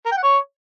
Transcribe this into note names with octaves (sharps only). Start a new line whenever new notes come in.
A#4
G5
F#5
C#5